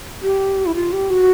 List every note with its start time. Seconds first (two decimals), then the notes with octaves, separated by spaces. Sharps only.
0.23 G4
0.66 E4
0.75 F4
0.93 G4
1.10 F#4